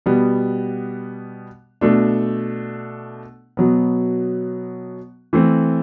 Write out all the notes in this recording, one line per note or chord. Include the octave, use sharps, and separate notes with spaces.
B2 G3 B3
B2 A3 D4
B2 F#3 B3
E3 A3 C4